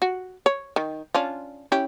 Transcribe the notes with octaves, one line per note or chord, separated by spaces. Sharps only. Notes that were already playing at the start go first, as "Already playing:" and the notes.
F#4
C#5
D#3
C#4 D4 F4
C#4 E4 G4